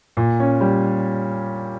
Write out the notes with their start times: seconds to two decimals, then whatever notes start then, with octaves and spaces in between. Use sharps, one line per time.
0.17 A#2
0.40 C#4
0.61 G3